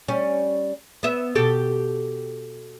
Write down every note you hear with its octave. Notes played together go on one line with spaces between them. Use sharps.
G3 C#4
B3 E5
B2 G4 A4